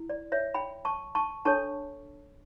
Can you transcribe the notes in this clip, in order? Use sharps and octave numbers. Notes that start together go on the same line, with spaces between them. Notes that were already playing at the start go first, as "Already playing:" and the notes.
Already playing: E4
D5
C#5 E5
G5 B5
A5 C#6
A5 C#6
D4 A4 C#5 A5 C#6